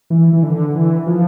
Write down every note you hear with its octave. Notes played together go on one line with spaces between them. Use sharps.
E3
E3
D3
E3
F3